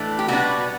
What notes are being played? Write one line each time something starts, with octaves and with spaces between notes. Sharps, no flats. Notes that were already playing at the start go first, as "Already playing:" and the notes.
Already playing: A2 E3 A3 D4
G4
B2 G3 B3 D4 F#4